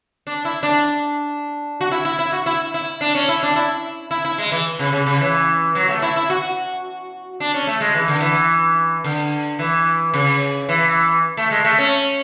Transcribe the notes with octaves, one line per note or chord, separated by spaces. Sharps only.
D4
E4
D4
F#4
E4
E4
E4
F#4
E4
E4
D4
C#4
E4
D4
E4
E4
E4
G#3
E3
C#3
C#3
C#3
E3
F#3
A3
E4
E4
F#4
D4
C#4
A3
G#3
E3
D3
E3
D3
E3
C#3
E3
A3
G#3
A3
C#4